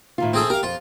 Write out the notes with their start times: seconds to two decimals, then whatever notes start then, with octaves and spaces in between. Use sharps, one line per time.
0.18 A2 D#3 F4
0.34 C4 G#4 A4
0.50 G4 A#4 F5
0.63 F2 F4